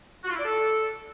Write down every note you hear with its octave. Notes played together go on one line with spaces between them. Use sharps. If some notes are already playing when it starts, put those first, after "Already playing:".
F#4
F4
E4
D5
A4